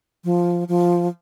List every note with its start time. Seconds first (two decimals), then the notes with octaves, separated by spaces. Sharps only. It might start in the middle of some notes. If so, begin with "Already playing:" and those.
0.24 F3
0.69 F3